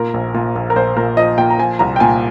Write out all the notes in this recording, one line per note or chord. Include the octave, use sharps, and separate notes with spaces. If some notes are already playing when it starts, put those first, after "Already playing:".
Already playing: A#2 A#4
A#1
A#2
A#1
A#4
A#1 C5
A#2 A#4
F3 D#5
A#2 G5
A#5
F3 G#5
C2 A#5
G5
A#2 G#5